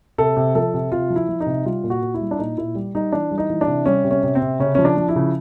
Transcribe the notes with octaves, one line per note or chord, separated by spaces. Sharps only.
C3 A4
C3
F3 A4
C3
C3 F4
F3
E4
F3
D#4
C3
G3 F4
A#2
F#4
A#2
E4
G3
D4
A#2 D#4
A#2 E4
G3
G3 D#4
E3 D4
G3
D#4
E3
D4
C3
G3 C#4
C3
C#4
C3
C4
C3
C#3 C#4
F3 C#4
D4
F3
E4
C#3